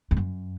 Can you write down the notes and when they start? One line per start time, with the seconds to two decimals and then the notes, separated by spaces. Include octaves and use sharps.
0.11 E2
0.17 F#2